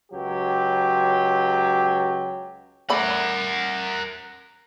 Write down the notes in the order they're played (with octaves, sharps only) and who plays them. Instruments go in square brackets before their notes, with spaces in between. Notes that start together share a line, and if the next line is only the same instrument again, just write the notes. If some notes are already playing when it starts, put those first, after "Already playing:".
[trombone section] C#2 F#3 G4
[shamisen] A3 D5 B5 [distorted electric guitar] A#4 F#5